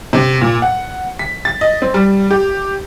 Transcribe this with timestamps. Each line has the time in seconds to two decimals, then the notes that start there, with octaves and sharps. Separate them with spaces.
0.13 C3
0.42 A#2
0.62 F#5
1.19 B6
1.45 A6
1.61 D#5
1.82 C4
1.94 G3
2.31 G4